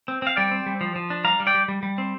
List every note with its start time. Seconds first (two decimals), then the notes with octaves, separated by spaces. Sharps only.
0.08 C4
0.22 C4 F5
0.37 G3 D5 G5
0.51 C4
0.66 G3
0.81 F3
0.96 F3
1.10 D4
1.25 G3 F5 A#5
1.40 G3
1.47 D5 G5
1.54 G3
1.68 G3
1.83 G3
1.98 C4